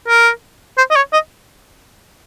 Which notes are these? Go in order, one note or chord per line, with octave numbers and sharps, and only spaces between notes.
A#4
C5
D#5
C#5
D#5